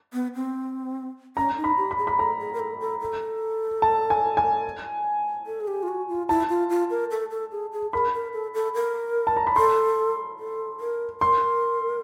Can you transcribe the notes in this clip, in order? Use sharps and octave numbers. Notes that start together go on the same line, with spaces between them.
B3
C4
C#4 A#5
D#4
B5
G4
B5
G#4
B5
A4 A#5
G#4
A#4
A4
A4
A4
A5
G#5
G#5
A4
G#4
G4
F4
F#4
F4
E4 A5
F4
F4
A#4
A4
A4
G#4
G#4
A#4 B5
A#4
A4
A4
A#4
A5
A#5
B5
A4 C6
A4
A#4
A#4 C6